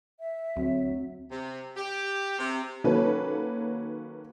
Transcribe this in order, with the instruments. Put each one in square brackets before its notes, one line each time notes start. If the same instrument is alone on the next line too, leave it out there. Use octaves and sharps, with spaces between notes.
[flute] E5
[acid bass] D2 [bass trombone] F#3 [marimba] C4
[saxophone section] C3
G4
C3
[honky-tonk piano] D#3 F#3 A#3 C#4 A4 B4